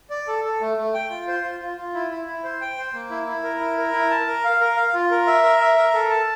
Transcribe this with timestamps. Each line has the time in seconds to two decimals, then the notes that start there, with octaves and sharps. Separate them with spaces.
0.10 D5
0.27 A4
0.45 A4
0.61 A3
0.77 A3
0.94 G5
1.10 F4
1.28 C5
1.44 F4
1.60 F4
1.77 F4
1.94 E4
2.11 E4
2.27 E4
2.44 C5
2.61 G5
2.77 C5
2.94 A#3
3.10 E4
3.27 E4
3.43 A#4
3.60 E4
3.77 A#4
3.94 E4
4.11 A5
4.27 A#4
4.44 F5
4.61 A#4
4.77 F5
4.94 F4
5.11 A#4
5.27 E5
5.43 A#4
5.61 E5
5.77 A#4
5.94 A4
6.10 A5